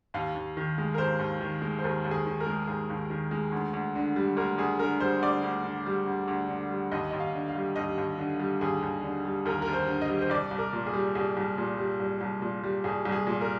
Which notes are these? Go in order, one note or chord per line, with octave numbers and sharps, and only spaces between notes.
D#2 F5
D#2
D#3
G#3
A#4
D#2 C5
D#2
D#3
G#3
C5
D#2 A#4
D#2
G#4
D#3
A#4
G#3
D#2 G#4
D#2
D#3
G#3
D2
D2
D3
G3
D2 A#4
D2 G#4
D3 A#4
G3 C5
D2 D5
D2
D3
G3
D2
D2
D3
G3
D#2 D#5
D#2 D#5
F5
D3
F5
G3
D#2 D#5
D#2
D3
G3
D#2 G#4
D#2
D3
G3
D#2 A#4
A#4
D#2
C5
D3
D#5
G3
C5
C2 D5
C2
A#4
A#2
G#4
G3
C2 G#4
C2
A#2
G3
C2
C2
A#2
G3
C2 G#4
C2
G#4
A#2
A#4